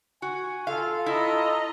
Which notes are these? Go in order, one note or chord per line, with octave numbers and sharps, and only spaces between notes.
F#4 G#5
F4 A4 F5
E4 D#5 A#5